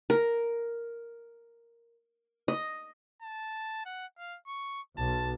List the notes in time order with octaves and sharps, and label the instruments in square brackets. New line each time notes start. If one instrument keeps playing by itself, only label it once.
[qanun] A#4
D#5
[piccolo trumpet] A5
F#5
F5
C#6
[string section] B1 [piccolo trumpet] A5